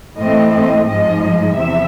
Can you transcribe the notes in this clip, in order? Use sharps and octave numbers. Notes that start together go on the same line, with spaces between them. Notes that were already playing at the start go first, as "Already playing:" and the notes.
A2 E3 A3 C4 D#5
D#5
G#2 F3 G#3 D#5
E2 C3 F3 E5